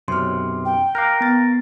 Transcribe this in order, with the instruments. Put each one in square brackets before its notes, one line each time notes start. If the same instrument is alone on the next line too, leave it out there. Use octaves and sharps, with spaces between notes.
[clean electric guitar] B1 F#2 C3 [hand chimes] C6 F6
[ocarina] G5
[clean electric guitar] A#4 F5 [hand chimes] D6 F#6 G6
[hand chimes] B3 A6